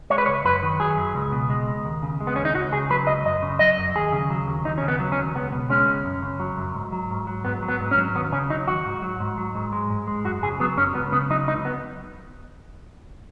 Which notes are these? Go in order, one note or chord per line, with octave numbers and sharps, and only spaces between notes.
G#3 C#5
B4
C#2 C#5
F#2 B4
D#3
F#3 G#4
F#2
C#2
B2
G#3
C#2
D#2
C#3
G#3
B3
D#2 C#4
D#4
C#2 F#4
C#3 G#4
F#3 B4
C#2 D#5
F#2 D#5
C#3
F#3 D#5
F#2
D#2 G#4
C#3
F#3
D#2
D#2 D#4
C#3 C#4
B3
F#3
C#4
D#2
C#2 B3
B2
G#3 C#4
C#2
F#2
C#3
F#3
F#2
G#2
F#3
G#2
F#3
G#2 B3
F#3
B3
G#2
C#4
F#3
D#2 B3
C#3 C#4
F#3 D#4
D#2 F#4
G#2
F#3
G#2
F#3
G#2
G#3
G#2
G#3
F#2 F#4
C#3 G#4
F#3 B3
F#2 C#4
C#2 B3
C#3 B3
F#3 D#4
C#2 D#4
B3